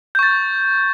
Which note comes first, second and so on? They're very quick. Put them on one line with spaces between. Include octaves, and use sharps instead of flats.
G6 C#6 A6